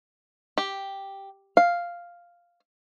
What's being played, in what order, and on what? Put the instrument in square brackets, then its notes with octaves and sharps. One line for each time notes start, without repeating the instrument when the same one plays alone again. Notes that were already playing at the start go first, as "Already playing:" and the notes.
[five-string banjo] G4
F5